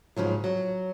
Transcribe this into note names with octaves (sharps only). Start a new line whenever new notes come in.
G#2 C#3 F3 F#3
F#3